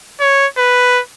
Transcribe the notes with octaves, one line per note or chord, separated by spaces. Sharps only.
C#5
B4